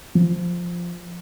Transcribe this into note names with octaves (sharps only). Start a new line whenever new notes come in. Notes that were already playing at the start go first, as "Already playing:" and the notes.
F3